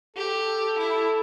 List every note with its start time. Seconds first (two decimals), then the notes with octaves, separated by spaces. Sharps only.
0.16 G4 A4
0.79 E4